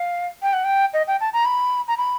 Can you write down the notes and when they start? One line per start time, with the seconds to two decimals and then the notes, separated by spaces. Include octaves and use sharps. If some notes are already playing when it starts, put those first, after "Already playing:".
Already playing: F5
0.42 G5
0.53 F#5
0.64 G5
0.93 D#5
1.07 G5
1.21 A5
1.33 A#5
1.45 B5
1.88 A#5
1.98 B5